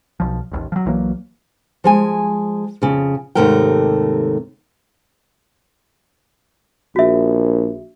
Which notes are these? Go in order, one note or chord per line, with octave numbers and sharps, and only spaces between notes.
B1 F3
E1 A1 D#2
F3 F#3
B1 E3 F#3 A#3
F3 G#3 G#5
F2 C#3
D#2 G#2 C3 A3 A#4 G5
A#1 F#4 E5